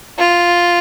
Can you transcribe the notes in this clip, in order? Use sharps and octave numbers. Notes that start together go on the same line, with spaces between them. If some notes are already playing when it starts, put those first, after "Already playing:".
F4